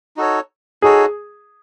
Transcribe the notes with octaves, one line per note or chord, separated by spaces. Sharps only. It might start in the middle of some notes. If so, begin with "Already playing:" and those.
D#4 F#4 A4 C#5
D#4 F#4 G#4 A4 C#5